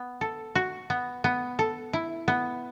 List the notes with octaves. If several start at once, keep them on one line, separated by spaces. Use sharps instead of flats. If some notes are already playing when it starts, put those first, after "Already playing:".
Already playing: B3
A4
F#4
B3
B3
A4
E4
B3